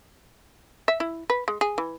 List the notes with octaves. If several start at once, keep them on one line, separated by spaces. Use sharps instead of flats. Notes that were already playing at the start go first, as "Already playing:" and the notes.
E5
E4
B4
G#3
G#4
E3